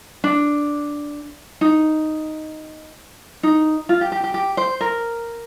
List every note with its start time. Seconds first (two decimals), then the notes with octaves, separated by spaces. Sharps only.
0.24 D4
1.61 D#4
3.43 D#4
3.89 F4
4.01 G4
4.12 G4
4.24 G4
4.34 G4
4.57 C5
4.81 A#4